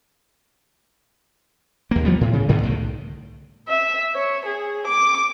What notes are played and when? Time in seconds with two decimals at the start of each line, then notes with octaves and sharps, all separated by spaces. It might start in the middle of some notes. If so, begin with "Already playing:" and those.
1.91 D#2 A#3
2.05 F3 G3 B3
2.21 A2
2.33 C#3
2.49 D2 G#2 D3 B3
2.62 C2 A2 D#3
3.68 E5
4.14 C#5
4.46 G#4
4.86 D6